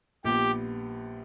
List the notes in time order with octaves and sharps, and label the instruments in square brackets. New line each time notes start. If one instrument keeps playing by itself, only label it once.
[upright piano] A#1 A#2 G3 B3 [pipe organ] G4